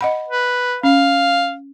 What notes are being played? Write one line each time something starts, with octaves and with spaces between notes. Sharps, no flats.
D#5 F#5 B5
B4
C#4 F5